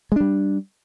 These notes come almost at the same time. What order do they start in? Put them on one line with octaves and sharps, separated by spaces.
G#3 D4 G3